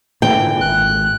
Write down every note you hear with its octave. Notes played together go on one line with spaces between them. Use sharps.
A#2 D3 E3 G5
G#1 F#6